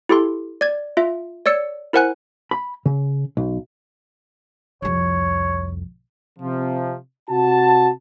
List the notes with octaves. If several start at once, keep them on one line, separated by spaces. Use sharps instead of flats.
E4 G4 A4 C6
D5 G#6
F4 E5
C#5 D5 E6 C#7
E4 A#4 C5 F#5 G#5 F#6
B5
C#3
B1
C2 F2 C#5
C3 F3
C3 F#4 A5